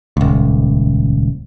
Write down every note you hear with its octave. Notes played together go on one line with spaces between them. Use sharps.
D#1 C#2